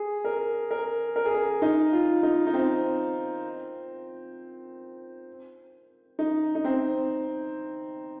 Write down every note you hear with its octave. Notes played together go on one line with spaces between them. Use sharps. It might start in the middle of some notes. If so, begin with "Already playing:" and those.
Already playing: G#4
A#4
A#4
A#4
G#4
A#4
D#4
F4
D#4
D#4
C4
D#4
D#4
C4